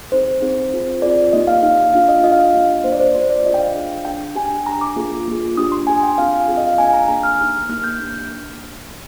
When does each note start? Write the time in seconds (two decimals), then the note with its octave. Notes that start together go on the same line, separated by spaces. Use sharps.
0.12 C4 D#4 G#4 C5
0.41 C4 D#4 G#4
0.72 C4 F4 G#4
1.02 C4 F4 G#4 D5
1.33 A#3 D#4 G4 D#5
1.47 F5
1.63 A#3 D#4 G4 F5
1.78 F5
1.94 D4 F4 G#4 F5
2.08 D#5
2.24 D4 F4 G#4 D#5
2.32 F5
2.39 D#5
2.54 A#3 D4 G4
2.84 A#3 D4 G4 C5
2.92 D5
3.00 C5
3.15 D4 F4 G#4 C5
3.30 D5
3.45 D4 F4 G#4 D#5
3.54 G5
3.59 F5
3.75 D4 G#4
4.05 D4 G#4 G5
4.21 G5
4.36 D4 G4 G#5
4.66 D4 G4 A#5
4.81 D6
4.96 A#3 F4 G#4
5.27 A#3 F4 G#4
5.57 D4 G4 D#6
5.72 C6
5.87 D4 G4 G#5
6.03 G5
6.18 C4 F4 G#4 F5
6.33 F5
6.47 C4 F4 G#4 F5
6.57 D#5
6.67 F5
6.78 A#3 D4 G#4 G#5
6.94 A#5
7.08 A#3 D4 G#4 A#5
7.23 F6
7.39 A#3 D#4 G4 F6
7.54 F6
7.69 A#3 D#4 G4 F6
7.84 G6
8.00 A#3 D4 G4